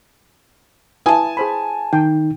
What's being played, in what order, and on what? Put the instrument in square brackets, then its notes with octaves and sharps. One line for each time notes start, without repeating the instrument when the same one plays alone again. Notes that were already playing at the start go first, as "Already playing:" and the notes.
[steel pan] E4 B4 D#6 [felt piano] G#5 A5
[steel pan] G#4 C5 B5
[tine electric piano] D#3 D#4 [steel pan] G5